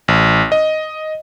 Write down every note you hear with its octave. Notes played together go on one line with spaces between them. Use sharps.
A1
D#5